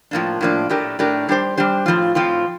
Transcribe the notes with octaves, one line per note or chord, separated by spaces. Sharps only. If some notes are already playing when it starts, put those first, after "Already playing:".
A2 F3 A#3 D4
A2 F3 A#3 D4
A2 A3 D4 G4 A#4
A2 A3 D4 G4 A#4
G3 D4 G4 C5
G3 D4 G4 C5
A2 F3 C4 F4
A2 F3 C4 F4